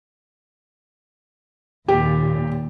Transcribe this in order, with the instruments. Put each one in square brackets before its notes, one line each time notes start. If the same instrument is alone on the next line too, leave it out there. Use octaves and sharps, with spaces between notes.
[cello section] D#2 A#2 [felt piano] G4